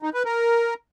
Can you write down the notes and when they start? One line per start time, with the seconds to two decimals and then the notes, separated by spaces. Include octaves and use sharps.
0.02 D#4
0.14 B4
0.25 A#4